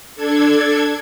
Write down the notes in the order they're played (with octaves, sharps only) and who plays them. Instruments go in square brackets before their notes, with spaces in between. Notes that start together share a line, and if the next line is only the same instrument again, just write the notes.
[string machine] D4 A4 G#6